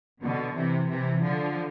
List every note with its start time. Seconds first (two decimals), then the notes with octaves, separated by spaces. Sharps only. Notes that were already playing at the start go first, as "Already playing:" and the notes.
0.22 B2 D3
0.55 C3 E3
0.88 C3 E3
1.22 D3 F3